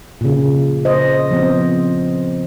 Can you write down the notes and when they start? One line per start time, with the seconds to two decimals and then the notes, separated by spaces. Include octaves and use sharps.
0.21 A#2 C#3
0.85 C5 D#5
1.30 F3 B3 C4